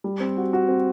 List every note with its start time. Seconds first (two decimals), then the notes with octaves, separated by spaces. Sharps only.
0.04 G3
0.20 C4
0.37 F#4
0.53 F#4
0.68 C4